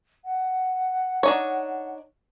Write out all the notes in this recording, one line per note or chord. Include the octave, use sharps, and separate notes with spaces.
F#5
D4 D#4 C#5